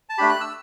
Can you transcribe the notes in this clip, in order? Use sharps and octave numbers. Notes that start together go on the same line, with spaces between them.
A5
A3 D4 G4 B5
F#6
E6